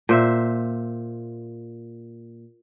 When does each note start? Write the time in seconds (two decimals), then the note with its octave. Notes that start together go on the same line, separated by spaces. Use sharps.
0.09 A#2 C5 E5